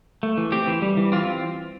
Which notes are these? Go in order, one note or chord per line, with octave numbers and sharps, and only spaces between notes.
A3
E3
C4 G4
E3
G3
E3
C4 F4